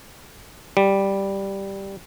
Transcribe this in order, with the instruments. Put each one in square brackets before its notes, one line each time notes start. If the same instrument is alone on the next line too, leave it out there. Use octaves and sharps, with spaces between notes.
[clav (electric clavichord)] G3